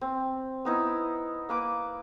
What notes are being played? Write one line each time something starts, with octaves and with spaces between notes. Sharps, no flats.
C4
B3 D#4 E4
A#3 B4 D6